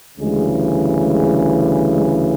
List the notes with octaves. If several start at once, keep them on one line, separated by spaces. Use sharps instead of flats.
D2 C#3 E3 G3 G#3
G#3
G#3